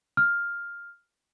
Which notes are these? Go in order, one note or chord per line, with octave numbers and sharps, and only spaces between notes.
F6